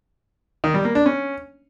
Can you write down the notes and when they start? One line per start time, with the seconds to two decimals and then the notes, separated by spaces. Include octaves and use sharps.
0.64 D#3
0.74 G3
0.85 A#3
0.95 D4
1.06 C#4